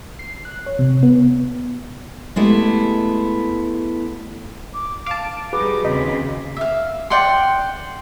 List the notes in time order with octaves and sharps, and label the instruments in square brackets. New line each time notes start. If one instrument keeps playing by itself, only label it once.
[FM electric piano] C7
F#6
C#5
C3
B3
[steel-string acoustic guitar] G#3 A3 B3 E4 G4
[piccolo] D6
[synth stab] F5 A5 [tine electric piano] D6 [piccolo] D7
[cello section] G3 D#4 [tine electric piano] F#4 G#4 B4 [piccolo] D6
[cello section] D#2 C#3 C4 [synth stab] D#4 [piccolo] B6
[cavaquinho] E5 F5
D5 F#5 G5 C6